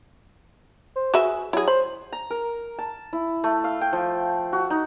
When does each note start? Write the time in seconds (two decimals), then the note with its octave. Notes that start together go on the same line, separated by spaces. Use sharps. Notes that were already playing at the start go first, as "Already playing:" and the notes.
0.96 C5
1.14 F#4 G#4 B4 E5
1.53 F#3 E4 G#4
1.68 C5 B5
2.12 A#5
2.30 A#4
2.79 A5
3.13 E4
3.44 A3
3.64 F5
3.81 G5
3.93 F3
4.53 F#4
4.70 D#4